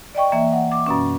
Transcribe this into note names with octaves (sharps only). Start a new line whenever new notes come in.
D5 D#5 G5 C#6
E3 A#3 E5
F#5
D6
F#2 B2 C#4